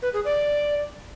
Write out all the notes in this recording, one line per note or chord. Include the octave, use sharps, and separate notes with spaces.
B4
G#4
D5